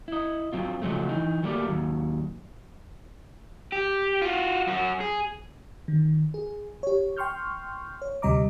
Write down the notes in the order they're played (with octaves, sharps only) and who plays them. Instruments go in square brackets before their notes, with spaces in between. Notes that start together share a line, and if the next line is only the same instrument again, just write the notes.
[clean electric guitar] E4 D#5
F#3 C4 F4
C#3 F3 F#3 G#3 A3
E3 D#4
F#3 G3 A3 A#3 D5
D#2 F#3
[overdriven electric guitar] G4
F4 F#4
F#2 F#4
G#4
[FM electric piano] D#3
G#4
G4 C#5
G5 C6 C#6 F6 G6
C#5
D2 C3 G3 D#5 A#5 D6